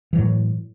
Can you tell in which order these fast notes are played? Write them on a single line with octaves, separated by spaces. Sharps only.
E3 F#3 A2